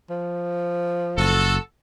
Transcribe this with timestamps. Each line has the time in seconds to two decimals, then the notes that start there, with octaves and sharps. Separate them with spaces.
0.10 F3
1.18 F#1 F#4 A4